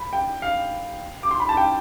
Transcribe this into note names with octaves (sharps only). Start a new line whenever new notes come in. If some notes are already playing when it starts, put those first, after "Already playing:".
Already playing: B5
G5
F5
D6
C6
B5
A5
G5